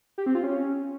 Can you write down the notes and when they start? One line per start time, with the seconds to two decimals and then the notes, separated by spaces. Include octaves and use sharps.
0.18 G4
0.26 C4
0.35 F4
0.44 C#4